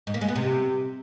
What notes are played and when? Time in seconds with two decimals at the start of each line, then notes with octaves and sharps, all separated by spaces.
0.07 G#2
0.14 A#3
0.21 G#3
0.28 B3
0.36 C3